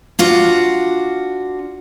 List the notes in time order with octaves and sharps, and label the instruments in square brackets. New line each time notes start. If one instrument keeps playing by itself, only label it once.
[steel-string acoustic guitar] D4 F4 F#4